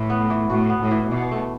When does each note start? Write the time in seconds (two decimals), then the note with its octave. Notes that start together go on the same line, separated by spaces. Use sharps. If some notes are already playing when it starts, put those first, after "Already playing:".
Already playing: A2 E3
0.10 B3
0.30 E3
0.50 A2 F#4
0.70 B3
0.80 A2
0.91 E3
1.11 B2 E3
1.31 A3